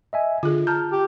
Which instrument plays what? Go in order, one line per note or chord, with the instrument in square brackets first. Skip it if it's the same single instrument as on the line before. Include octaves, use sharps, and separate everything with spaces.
[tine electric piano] D#5 E5 G#5
[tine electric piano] D3 [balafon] F4 G#4
[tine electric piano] A5 F6 G6 [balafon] A#5
[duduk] G4